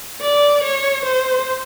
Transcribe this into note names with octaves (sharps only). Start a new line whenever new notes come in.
D5
C#5
C5